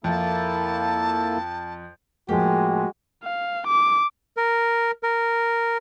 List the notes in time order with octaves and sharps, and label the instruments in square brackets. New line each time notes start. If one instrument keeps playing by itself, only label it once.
[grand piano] F2 [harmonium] A#3 E4 A4 [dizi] A5
[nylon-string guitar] A2 F3 A#3 [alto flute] G#3 [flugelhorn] F#4 [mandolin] G4
[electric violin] F5
D6
[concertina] A#4
A#4